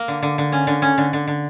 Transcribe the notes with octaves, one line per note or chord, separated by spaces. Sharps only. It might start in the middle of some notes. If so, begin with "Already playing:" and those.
Already playing: A#3
D3
D3
D3
C#4
D3
C#4
D3
D3
D3